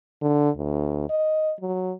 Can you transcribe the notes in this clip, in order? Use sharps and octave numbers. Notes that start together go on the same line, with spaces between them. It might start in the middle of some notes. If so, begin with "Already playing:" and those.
D3
D2
D#5
F#3